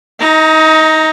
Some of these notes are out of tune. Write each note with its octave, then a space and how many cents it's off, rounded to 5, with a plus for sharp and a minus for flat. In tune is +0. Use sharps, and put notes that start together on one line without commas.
D#4 +25 A#5 +0